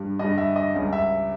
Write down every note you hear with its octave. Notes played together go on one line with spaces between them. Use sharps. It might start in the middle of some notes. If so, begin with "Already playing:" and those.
Already playing: G2 G3
G2 G3 D#5
E5
D#5
C#2 C#3 G3
E5